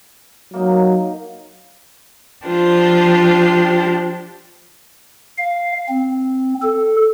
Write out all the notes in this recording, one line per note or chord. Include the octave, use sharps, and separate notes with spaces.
F#3 A#3 D#4
F3 D4 F4 G4 C5
F5
C4
A4